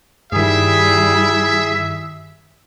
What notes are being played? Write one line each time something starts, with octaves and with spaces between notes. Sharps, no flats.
G2 D#3 G3 E4 G#4 E5